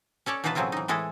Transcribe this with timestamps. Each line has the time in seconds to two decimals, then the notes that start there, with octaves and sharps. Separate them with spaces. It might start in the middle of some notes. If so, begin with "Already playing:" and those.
0.26 C#4 A4 C#5 D5
0.44 B2 E3 D#4 F4 B4 A5
0.55 A2 C#3 F#3 C4 E4 F4
0.72 E3 D#4
0.88 A2 E3 G#3 E4 A4